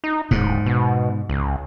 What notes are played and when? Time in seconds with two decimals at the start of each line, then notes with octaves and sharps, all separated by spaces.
0.04 D#4
0.31 D1 G#2
0.66 B2
1.29 C#2